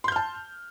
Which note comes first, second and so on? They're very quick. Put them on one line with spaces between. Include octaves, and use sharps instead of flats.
C6 G6 F6 A5